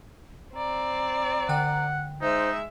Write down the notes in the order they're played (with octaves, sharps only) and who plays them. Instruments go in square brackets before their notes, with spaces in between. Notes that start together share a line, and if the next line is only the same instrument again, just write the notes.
[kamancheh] C4 D5 [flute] A#5
[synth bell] D3 G5 F#6 [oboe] F#5
[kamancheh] G#3 E5 [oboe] D#4 [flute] C5